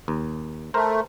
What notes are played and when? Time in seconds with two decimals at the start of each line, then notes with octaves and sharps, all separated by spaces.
0.08 D#2
0.74 A3 A#4 C5